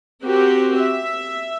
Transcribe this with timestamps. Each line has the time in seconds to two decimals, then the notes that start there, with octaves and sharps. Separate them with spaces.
0.23 C4 F#4 G4 A#4
0.79 E5